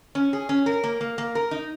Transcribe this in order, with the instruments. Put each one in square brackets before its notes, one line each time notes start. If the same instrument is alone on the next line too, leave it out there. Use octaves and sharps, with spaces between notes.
[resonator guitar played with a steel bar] C#4
G#4
C#4
A#4
A#3
A#3
A#3
A#4
D#4